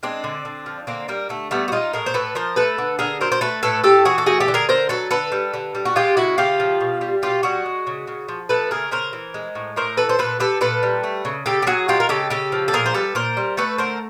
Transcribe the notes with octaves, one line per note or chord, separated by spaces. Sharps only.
G#3 C4 D4
D3
D3
F3
D3 A#3 C4
G3 A#3
D3 A3
G3 A3 B3
F#4
G#3 D#4 F4
A2 G#4 A#4
C5
A2 A4 B4
F3 A#4 C5
A3 A4 B4
D3
D3 G#4 A#4
F#3 A#4 C5
C5
A3 A4 B4
A2 A4 B4
A2 G4 A4
E3 F#4 G#4
A4
A3 F#4 G#4
G4 A4
D3
G#4 A#4
D3 A#4 C5
F#3 A4 B4
D3 A4 B4
G3
D3
G3
F#4
G#3 F4 G4
C#3 E4 F#4
C#3 F4 G4
F3
B2
G3
B2 F4 G4
G3 F#4 G#4
G#3
C#3
C#3
F3
A3 A4 B4
C#3 G#4 A#4
C#3 A#4 C5
E3
G#3
A2
A2 A#4 C5
E3 A4 B4
C5
A#2 A4 B4
G3 A4 B4
A#2 A4 B4
G3
A3
C#3
C#3 G4 A4
G4
F#3 F#4 G#4
G#3 F4 G4
A#4
C#3 G4 A4
C#3 G4 A4
F3
A4
A#2 G#4 A#4
C5
G3 A4 B4
A#2 A#4 C5
G3
A3 A4 B4
D3 A#4 C5